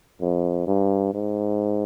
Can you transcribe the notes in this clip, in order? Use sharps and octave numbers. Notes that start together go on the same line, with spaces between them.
F2
G2
G#2